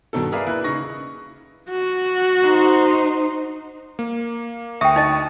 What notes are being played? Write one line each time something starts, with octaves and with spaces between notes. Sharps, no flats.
G2 B2 D#3 A4
G#4 A#4 B4 D5 E5 F5
A#3 E4 B4 F#6
C#3 D#4 C#6 A#6
F#4
D#4 C5
A#3
D2 E5 G5 C#6 D#6
D#4 D#5